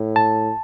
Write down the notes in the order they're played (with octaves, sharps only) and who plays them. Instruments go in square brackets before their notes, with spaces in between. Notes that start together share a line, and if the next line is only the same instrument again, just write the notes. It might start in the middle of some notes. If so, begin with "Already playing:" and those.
Already playing: [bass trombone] A2
[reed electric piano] A5